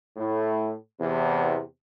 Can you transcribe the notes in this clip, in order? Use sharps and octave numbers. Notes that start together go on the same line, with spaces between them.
A2
E2 C3